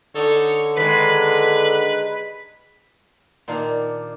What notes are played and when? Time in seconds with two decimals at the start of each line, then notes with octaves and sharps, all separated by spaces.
0.16 D3 D#4 A4 C#5
0.78 D#3 G#3 B4 B6
3.48 A#2 D#3 A#3 D4